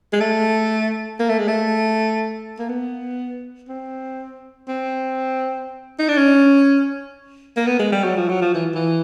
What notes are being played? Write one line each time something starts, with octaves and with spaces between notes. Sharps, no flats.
G#3
A3
A#3
A3
G#3
A3
A#3
B3
C4
C4
D#4
D4
C#4
A#3
B3
G#3
G3
F#3
F3
F#3
F3
E3
E3